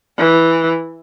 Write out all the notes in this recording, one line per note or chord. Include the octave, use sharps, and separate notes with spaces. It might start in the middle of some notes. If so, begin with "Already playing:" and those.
E3